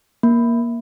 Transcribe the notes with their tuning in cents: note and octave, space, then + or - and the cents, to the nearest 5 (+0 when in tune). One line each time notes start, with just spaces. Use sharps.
A#3 +10